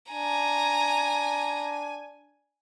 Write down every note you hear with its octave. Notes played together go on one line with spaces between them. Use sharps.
D4 G#5 A#5